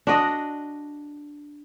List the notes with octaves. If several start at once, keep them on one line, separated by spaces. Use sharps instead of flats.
D4 F#4 D#5